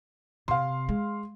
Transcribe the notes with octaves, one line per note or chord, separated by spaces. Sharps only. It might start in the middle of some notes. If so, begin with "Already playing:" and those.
C3 F5 C6
G#3